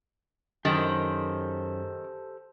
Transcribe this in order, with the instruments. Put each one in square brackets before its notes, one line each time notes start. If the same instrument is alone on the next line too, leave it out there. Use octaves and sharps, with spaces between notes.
[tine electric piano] F#2 [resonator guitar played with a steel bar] D#3 [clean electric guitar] G4 A4 C5